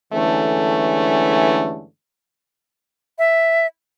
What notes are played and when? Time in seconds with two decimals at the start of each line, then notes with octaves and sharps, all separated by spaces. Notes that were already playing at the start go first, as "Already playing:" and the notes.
0.13 G2 D3 E3 G#3 A3 C#4
3.19 E5